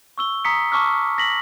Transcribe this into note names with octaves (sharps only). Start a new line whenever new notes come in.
C#6 E6 G7
A#5 D#6 B6 C#7
A5 C#6 D6 E6 F6
A#6 B6 F#7